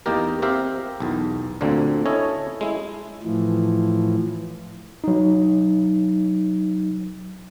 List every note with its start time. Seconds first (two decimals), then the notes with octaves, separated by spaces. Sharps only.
0.06 E2 A#3 D#4 G4 A#4
0.42 C4 G4 A#4 E5 F5
1.00 B1 E2
1.61 D2 A#2 D3 A#3 C4
2.06 C#4 E4 A4 C#5 D#5
2.61 G#3 E4
3.23 A2 E3 F3
5.04 F#3 D#4